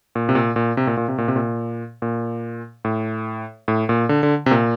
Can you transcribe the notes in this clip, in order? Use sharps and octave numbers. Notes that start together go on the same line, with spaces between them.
A#2
C3
A#2
A#2
C3
A#2
A#2
C3
A#2
C3
A#2
A#2
A2
A2
A#2
D3
D3
C3
A#2